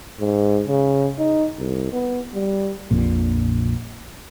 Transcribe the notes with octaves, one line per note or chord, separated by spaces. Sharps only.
G#2
C#3
D#4
C2
B3
G3
A#1 F2 A#2